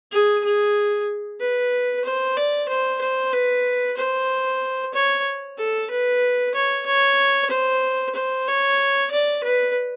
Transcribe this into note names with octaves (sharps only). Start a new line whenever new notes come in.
G#4
G#4
B4
C5
D5
C5
C5
B4
C5
C#5
A4
B4
C#5
C#5
C5
C5
C#5
D5
B4